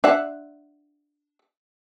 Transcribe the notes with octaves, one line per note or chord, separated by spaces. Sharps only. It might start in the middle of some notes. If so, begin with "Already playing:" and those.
D4 E5 F#5